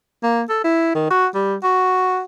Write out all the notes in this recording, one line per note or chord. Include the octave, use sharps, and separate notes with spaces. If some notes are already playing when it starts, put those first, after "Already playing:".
A#3
A4
E4
D#3
F#4
G3
F#4